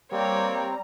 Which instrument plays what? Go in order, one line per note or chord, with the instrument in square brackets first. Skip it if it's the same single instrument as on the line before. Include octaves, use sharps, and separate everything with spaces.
[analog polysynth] G3 A#5 [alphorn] A#3 [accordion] C4 [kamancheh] C#5 D5